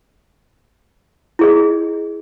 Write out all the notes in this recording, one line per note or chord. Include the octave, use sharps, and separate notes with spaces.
E4 G#4 D#5